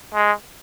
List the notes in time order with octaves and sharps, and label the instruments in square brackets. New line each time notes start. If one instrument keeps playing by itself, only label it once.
[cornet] G#3